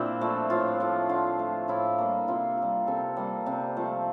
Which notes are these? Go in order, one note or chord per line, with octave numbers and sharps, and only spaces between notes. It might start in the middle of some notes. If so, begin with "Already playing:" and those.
Already playing: A#2 C4 D4 E4
F3 A3
A2 F4
F3 A3
D3 F4
A3
A2 E4
G3 A#3
C3 F4
G3 A#3
C3 A4
G3 A#3
C3
F3 A3